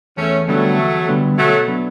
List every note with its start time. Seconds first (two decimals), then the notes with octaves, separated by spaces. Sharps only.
0.17 E2 A3 C#4
0.48 D3 F#3 G3 A3 B3 D4
0.78 E2
1.08 D3 G3 B3 D4
1.37 B2 F#3 A3
1.68 F#3 B3 D4